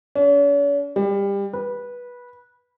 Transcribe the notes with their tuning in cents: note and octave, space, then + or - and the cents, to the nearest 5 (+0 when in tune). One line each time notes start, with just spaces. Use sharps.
C#4 +45
G3 +25
B4 -15